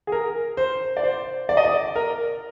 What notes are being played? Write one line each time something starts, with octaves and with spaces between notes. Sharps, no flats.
G#4
A#4
C5
D5
C5
D5
D#5
D5
A#4